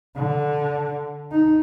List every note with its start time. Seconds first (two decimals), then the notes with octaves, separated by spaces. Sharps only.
0.16 D3
1.31 D#4